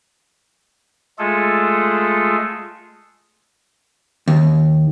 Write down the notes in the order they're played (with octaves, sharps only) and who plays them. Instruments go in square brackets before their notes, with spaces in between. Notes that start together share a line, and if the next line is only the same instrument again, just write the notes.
[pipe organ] G#3 A3 F4 G#4 A4
[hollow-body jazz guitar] D#2